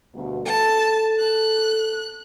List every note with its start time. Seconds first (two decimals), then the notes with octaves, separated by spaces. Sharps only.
0.15 D2 G2 B2
0.46 A4 A5
1.19 F#6